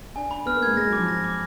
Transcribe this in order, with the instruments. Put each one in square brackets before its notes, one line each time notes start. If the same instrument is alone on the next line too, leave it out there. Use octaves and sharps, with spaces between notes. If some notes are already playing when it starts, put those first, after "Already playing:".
[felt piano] D4 [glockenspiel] G#5
[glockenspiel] B5
[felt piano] B3 [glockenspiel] F6
[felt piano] A#3
[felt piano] G#3 [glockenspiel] G#6
[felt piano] G#3 [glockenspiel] A#6
[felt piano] F#3
[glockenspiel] D6
[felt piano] F3
[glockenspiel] A#6
D6